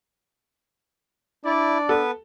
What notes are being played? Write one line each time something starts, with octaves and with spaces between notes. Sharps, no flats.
D4 E4 D5
B3 A4 B4